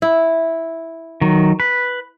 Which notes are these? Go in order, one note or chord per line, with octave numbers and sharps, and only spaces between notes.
E4
D#3 F#3
B4